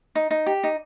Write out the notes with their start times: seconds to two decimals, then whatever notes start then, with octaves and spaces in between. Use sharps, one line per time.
0.15 D#4
0.31 D#4
0.46 G4
0.63 D#4